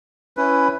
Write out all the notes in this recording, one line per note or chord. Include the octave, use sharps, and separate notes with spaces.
C#4 E4 B4